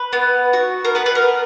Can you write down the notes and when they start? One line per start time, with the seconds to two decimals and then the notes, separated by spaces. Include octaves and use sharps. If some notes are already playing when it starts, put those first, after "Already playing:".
Already playing: B4
0.13 B3
0.53 F#4
0.85 A#4
0.95 B3 B4
1.06 B4
1.15 A#4